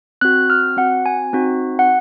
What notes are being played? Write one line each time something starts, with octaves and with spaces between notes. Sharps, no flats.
C4 F#4 F#6
F6
C4 F#4 F#5
G#5
C4 D#4 F#4
F#5